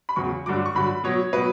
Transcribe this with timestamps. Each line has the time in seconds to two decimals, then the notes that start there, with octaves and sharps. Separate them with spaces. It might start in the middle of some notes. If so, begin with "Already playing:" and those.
0.09 B5
0.16 E2 C#3 F#3 C#6
0.46 G2 D3 F#3 D6
0.66 C#6
0.75 G2 D3 F#3 B5
1.04 B2 F#3 C#5
1.33 B2 F#3 B4